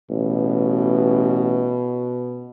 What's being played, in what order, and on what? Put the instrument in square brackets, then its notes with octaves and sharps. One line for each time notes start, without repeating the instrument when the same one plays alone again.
[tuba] A1 [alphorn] B2